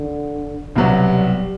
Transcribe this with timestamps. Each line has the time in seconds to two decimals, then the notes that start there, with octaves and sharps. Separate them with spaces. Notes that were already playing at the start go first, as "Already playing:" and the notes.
Already playing: D3
0.75 C2 B2 F#3 G3 B3
1.13 G3